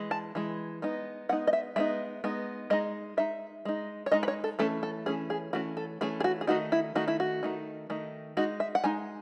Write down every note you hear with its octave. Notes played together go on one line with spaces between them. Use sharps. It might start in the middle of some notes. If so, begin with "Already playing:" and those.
Already playing: E3 G#3
A5
E3 G#3
G#3 B3 D#4
G#3 B3 D#4 F#5
D#5
E5
G#3 B3 D#4 E5
G#3 B3 D#4
G#3 D#4 D#5
G#3 D#4 E5
G#3 D#4
C#5
G#3 D#4 D#5
B4
C#5
A4
E3 A3 C#4 A4
A4
E3 A3 C#4 G#4
G#4
E3 A3 C#4 F#4
A4
E3 A3 C#4 G#4
G#4
F#4
G#4
D#3 A3 D#4 F#4
E4
D#3 A3 D#4 F#4
E4
F#4
D#3 A3 D#4
D#3 A3 D#4
G#3 D#4 F#4
E5
F#5
G#3 D#4 G#5